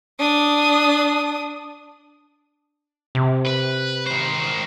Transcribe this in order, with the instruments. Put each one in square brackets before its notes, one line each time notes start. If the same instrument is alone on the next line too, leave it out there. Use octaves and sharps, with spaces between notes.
[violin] D4 D#6
[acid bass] C3
[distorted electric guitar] B4
D#3 C5